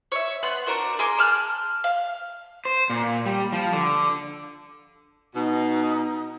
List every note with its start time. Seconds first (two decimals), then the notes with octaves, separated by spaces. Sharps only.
0.12 C#5 E5
0.43 B3 F#5 C6 F#6
0.66 D4 F#4 A#4 C5
0.99 G#4 A#4 C6 D6
1.18 A5 F6 F#6
1.84 F5
2.65 C5
2.90 A#2
3.26 G3
3.52 F3
3.73 D3
5.35 B2 D#4